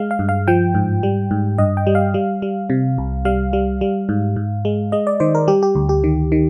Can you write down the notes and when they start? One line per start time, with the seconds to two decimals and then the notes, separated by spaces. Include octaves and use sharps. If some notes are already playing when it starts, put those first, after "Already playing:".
Already playing: G#3 F5
0.11 F5
0.19 G2
0.29 F5
0.48 F3 G5
0.75 G#2
1.03 G3
1.31 G#2
1.58 G2 D#5
1.77 G5
1.87 G3
1.95 F5
2.14 G3
2.42 G3
2.70 C3
2.98 C2
3.25 G3 F5
3.53 G3
3.81 G3
4.09 G#2
4.36 G#2
4.65 G#3
4.92 G#3 D#5
5.07 D5
5.20 D#3 C5
5.35 A#4
5.48 G3 G4
5.63 G4
5.75 D2
5.89 G4
6.04 D#3
6.32 D#3